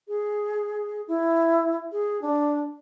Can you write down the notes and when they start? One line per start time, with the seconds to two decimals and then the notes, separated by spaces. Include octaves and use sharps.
0.08 G#4
1.08 E4
1.92 G#4
2.22 D4